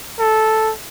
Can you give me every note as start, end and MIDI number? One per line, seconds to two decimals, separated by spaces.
0.19 0.72 69